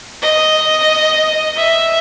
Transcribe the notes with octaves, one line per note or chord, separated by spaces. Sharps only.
D#5
E5